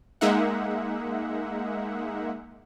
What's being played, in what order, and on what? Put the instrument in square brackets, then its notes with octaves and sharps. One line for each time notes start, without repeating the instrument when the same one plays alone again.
[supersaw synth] G#3 A#3 D#4 E5 F#5